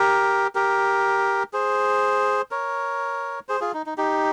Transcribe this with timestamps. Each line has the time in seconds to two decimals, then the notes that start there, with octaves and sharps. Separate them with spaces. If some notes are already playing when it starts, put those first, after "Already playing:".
Already playing: G4 A#4
0.55 G4 A#4
1.53 G#4 C5
2.51 A#4 C#5
3.49 G#4 C5
3.61 F4 G#4
3.74 D#4
3.86 D#4
3.98 D#4 G4